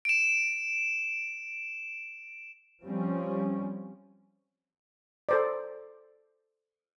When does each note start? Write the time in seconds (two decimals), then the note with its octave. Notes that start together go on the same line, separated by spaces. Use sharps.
0.05 D7 E7
2.83 F3 G3 C4 C#4
5.29 A4 C5 D5